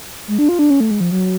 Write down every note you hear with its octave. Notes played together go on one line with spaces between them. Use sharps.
G#3
D4
F4
D4
C#4
A3
G#3
F3
F#3